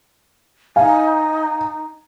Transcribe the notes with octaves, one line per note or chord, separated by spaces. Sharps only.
D#4 F5 G#5